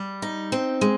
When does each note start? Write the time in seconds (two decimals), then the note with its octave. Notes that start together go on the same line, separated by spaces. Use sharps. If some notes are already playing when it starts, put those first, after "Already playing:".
Already playing: G3
0.22 D#4
0.52 C4
0.81 G#3